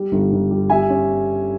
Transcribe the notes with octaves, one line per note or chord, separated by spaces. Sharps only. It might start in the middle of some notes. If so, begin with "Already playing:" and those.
Already playing: G3
G1
G1
G3
G3 E5 G#5
C#4